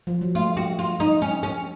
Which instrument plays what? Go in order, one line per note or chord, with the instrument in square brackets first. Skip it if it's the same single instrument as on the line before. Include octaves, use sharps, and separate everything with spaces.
[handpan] F3
F#3
[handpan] A3 [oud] F4
[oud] F#4
F4
D#4
C#4
C#4